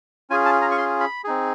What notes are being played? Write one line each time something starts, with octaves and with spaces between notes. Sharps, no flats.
C#4 F4 G#4 G#5
A5
A#5
C#6
C6
B5
C4 D#4 G#4